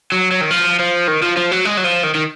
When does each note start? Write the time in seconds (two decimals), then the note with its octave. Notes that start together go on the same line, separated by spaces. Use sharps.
0.12 F#3
0.31 F#3
0.41 D#3
0.51 F3
0.79 F3
1.08 D#3
1.22 F3
1.37 F3
1.51 F#3
1.65 G#3
1.77 F#3
1.84 F3
2.03 D#3
2.15 D#3